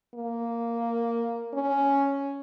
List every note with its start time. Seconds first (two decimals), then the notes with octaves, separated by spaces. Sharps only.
0.15 A#3
1.54 C#4